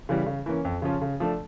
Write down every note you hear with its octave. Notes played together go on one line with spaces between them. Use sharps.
C#3 E3 G3
C#3
E3 A#3 C#4
F2
C#3 F3 C#4 F4
C#3
F3 A3 D4